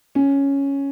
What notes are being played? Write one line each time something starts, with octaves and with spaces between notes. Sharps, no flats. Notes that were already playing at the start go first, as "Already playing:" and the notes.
C#4